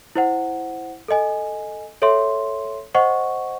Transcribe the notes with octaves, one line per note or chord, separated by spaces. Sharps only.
E4 C5 F#5
A4 D#5 G#5
A4 C#5 E5 C6
C5 D#5 F#5 C#6